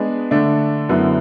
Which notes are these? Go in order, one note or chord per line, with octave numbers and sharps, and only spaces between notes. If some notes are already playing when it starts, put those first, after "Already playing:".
Already playing: G#3 B3 D4 G#4
D3 A3 D4
F#2 D3 F#3 B3 E4